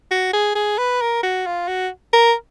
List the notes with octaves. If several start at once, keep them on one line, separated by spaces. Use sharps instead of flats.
F#4
G#4
G#4
B4
A#4
F#4
F4
F#4
A#4